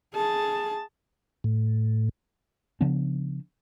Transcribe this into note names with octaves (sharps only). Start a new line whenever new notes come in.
G#4 A5
A2
C#3 F3 B3 D4